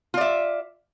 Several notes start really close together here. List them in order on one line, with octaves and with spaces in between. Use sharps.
F4 D5 E5